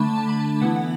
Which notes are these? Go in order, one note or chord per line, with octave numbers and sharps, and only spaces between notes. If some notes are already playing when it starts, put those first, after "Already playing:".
Already playing: D3 A3 D4 A5 B5
A5
B5
A5
E3 B3 E4 F#5
F#5